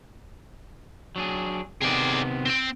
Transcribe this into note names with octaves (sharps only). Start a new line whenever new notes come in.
F#3 D4 G#4
C3 D#3 B3 G#4 D5
C4 G5